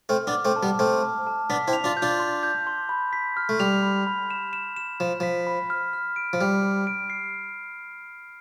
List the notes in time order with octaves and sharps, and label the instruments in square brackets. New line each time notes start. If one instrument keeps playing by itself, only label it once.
[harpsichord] A3 C4 [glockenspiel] F6
[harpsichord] B3 D4
[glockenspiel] D6
[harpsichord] A3 C4
[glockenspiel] A5
[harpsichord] G3 B3
[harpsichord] A3 C4 [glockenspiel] F6
[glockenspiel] A5
A5
[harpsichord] B3 D4 [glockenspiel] B6
[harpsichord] C4 E4
[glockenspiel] F7
[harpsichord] D4 F4
[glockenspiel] G6
[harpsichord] D4 F4
[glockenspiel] C6
G6
C6
B5
B6
F6
[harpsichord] A3
[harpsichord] G3 [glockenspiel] F7
[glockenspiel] B5
B5
E7
E7
E7
[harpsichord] F3 [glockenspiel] E7
[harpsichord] F3 [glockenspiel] B6
[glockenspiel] B5
F6
F6
D7
[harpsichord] F3
[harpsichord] G3 [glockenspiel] F6
[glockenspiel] F6
D7
C7